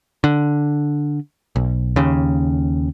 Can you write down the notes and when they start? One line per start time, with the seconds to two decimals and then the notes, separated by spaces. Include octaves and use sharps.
0.24 D3
1.56 B1
1.96 D#2 C#3